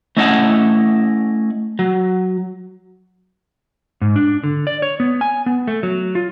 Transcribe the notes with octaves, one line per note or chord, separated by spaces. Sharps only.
A3 C#4 E4 D#5 F#5 A5
F#3
G#2
D4
D3
D5
C#5
B3
G#5
B3
A3
F#3
F4